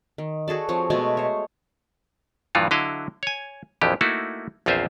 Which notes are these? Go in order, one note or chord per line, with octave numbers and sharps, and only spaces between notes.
D#3
F#4 G#4 A4 D5
F3 C4 C#5
B2 G#3 A3 G#5
C5 C#5
G2 A#2 E3 F3 F4 F#4
D3 F#3 E4 D#5 F5
C#5 G#5
A#1 F2 E3 F3 G4
A3 A#3 D#4 E4 F#4
A#1 E2 C4 F4 C5 E5